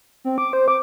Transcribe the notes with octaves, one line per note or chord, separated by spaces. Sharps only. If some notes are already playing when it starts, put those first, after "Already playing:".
C4
D6
C5
D6